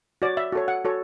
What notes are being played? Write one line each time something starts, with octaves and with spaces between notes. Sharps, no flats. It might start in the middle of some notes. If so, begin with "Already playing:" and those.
F#4 C#5 D5
E5
F#4 A4 C#5
F#5
F#4 A4 C#5